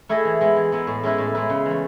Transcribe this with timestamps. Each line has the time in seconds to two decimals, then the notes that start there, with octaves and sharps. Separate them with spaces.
0.09 A3 E4 G#4 D#5
0.25 E3
0.41 G#3 B3 E4
0.56 E3
0.72 G#3 B3 E4
0.87 A2
1.03 G#3 C#4 E4 B4
1.18 A2
1.35 G#3 C#4 E4 B4
1.49 C#3
1.66 E3 A3